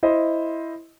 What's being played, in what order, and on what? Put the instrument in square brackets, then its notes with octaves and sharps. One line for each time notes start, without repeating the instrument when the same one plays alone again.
[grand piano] E4 C5 D#5